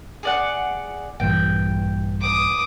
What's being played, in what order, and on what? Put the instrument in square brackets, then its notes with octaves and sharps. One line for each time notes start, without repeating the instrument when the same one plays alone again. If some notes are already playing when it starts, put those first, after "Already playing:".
[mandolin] G#4 D5 F#5
[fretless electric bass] A#1 G2 E3 [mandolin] G5
[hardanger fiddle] D6 D#6